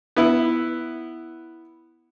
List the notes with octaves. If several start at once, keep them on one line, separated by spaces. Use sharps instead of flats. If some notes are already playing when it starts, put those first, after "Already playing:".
B3 E4